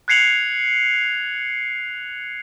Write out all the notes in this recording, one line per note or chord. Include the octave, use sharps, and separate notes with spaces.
F#6 G#6 C7 C#7 F7 F#7